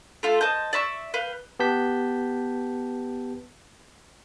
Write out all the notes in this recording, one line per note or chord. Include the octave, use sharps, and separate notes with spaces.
A3 F4 A4
C5 D#5 A5 G6
D5 E5 C#6 E6
B4 F5 G5
B3 G4 B4 A5 G6 B6